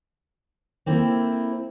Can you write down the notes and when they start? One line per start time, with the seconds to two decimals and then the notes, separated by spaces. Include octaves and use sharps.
0.86 A#3 C4 E4 A4